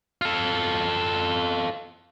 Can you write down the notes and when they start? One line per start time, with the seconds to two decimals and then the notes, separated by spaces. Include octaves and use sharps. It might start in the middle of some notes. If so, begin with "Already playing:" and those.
0.21 F4 A4